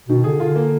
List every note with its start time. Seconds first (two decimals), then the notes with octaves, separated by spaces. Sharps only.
0.08 B2 D#3
0.24 D3 G#4
0.40 D3 F4
0.55 A#3